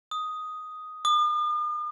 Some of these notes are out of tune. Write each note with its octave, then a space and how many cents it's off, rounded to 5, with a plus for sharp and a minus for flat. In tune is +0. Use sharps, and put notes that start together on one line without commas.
D#6 +5
D#6 -45